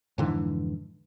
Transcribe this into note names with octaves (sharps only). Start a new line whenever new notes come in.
F2 G#2 D3 E3